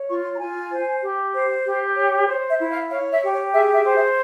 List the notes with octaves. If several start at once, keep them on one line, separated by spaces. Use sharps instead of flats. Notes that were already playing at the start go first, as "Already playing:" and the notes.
Already playing: C#5
F4 C#6
C6
A#5
F4 G#5
C5
G4
C5
G4
C#5
C5 C#5
E5
E4
F5
C#5 F5
E5
G4
C#5
G#4 E5
E5
C5
E5